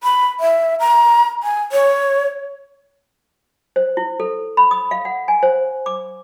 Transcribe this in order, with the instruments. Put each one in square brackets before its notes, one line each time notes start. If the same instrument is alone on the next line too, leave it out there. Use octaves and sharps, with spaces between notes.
[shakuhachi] B5
E5
A#5
G#5
C#5
[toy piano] C5
E4
A4
B5
D#6
F5
F#5
G#5
C5
D6